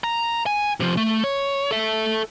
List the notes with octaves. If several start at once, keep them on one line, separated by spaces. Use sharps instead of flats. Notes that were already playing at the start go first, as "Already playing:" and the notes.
A#5
G#5
C3 F3
A3
C#5
A4 E5